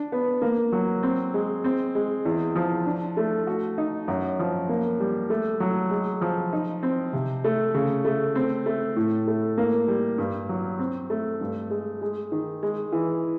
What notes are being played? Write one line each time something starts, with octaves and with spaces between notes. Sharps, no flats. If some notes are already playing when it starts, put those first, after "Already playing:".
Already playing: D4
B3
A#3
F#3
C4
G#3
C4
G#3
E2
F3
D4
A3
F#4
D#4
F#2
F3
A#3
G3
A3
F#3
G#3
F3
D#4
C4
C3
A3
C#3
A3
C4
A3
A2
A3
A#3
G3
G2
F#3
C4
A3
G2
G#3
G#3
D#3
G#3
E3